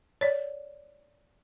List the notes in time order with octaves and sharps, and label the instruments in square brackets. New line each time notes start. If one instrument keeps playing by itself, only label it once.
[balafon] C#5 D5